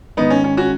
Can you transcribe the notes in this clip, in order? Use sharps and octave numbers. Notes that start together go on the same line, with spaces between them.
G#2 D#3 B3 D#4
C#4
C#4
C#4 F#4